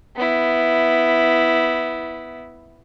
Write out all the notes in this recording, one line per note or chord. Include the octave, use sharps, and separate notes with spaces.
B3 E4